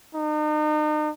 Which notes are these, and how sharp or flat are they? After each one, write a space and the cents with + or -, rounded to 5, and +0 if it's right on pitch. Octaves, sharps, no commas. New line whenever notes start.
D#4 -40